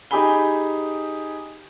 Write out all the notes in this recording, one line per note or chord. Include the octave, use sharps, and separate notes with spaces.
D#4 G4 G#4 G#5 B5 G7